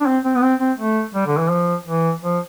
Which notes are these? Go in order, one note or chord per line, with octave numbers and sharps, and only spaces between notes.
D4
C4
C4
B3
C4
C4
A3
G3
D3
E3
F3
E3
F3